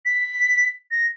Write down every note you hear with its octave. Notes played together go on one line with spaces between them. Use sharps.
B6
A#6